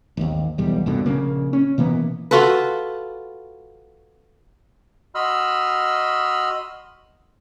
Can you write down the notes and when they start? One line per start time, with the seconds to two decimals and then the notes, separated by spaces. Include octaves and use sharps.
0.17 G#1 D#2
0.58 B1 E2 G3
0.86 C2 G2 B2 D3
1.06 A#1 C#3 A#3
1.53 C#4
1.78 B2 E3 A#3 B3
2.31 F4 F#4 A4 B4
5.15 F#4 D#5 B5 C6 E6 F6